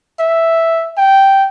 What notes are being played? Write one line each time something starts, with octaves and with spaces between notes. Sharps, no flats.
E5
G5